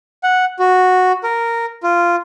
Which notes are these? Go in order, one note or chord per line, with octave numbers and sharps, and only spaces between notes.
F#5
F#4
A#4
F4